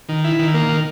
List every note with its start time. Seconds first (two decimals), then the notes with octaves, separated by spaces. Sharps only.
0.09 D#3
0.24 E4
0.39 D#3
0.54 A#3
0.69 D#3